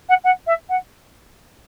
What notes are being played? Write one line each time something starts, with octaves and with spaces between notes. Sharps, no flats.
F#5
F#5
E5
F#5